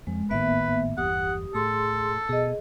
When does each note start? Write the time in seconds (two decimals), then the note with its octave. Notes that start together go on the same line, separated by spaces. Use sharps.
0.07 F2 F3 G#3
0.30 G#1 A2 D#3 A#3 B3 B4 E5
0.98 G1 E2 G4 F#5 D#6
1.55 A2 G#4 A4 C6
2.29 B2 G#4 D#5